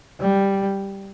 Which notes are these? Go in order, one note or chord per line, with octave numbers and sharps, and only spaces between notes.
G3